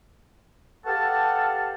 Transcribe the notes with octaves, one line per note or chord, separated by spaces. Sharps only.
G4 A4 B4 F5 F#5 A5